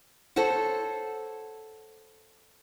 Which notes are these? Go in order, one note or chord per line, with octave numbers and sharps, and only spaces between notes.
A4 C5 C#5 F#5